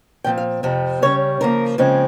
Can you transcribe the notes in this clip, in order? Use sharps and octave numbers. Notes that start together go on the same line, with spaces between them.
A#2 F3 C4 G5
F5
F2 C3 F3 C4
C#3 G3 C#4 C#5
C#3 F3 A#3 A#4
C#3 F3 G#3 C4